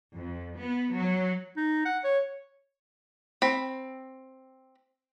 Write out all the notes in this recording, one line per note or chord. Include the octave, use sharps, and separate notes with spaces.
F2
B3
F#3
D#4
F#5
C#5
C4 B5